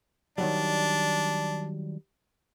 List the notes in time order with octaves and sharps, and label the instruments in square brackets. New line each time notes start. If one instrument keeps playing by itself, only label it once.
[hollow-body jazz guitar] D#3 F#3 G3 [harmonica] D4